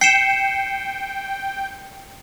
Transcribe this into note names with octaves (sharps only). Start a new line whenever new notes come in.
G5 C7 C#7 E7